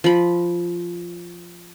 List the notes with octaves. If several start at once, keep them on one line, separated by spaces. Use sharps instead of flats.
F3 B5